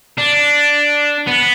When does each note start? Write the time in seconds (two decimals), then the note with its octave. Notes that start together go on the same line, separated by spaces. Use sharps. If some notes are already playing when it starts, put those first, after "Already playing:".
0.18 D4
1.27 B3